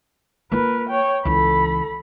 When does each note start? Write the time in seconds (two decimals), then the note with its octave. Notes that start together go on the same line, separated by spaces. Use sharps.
0.52 A#3 F4 A#4 B4
0.89 C#5 G5
1.25 C#2 E3 A4 B5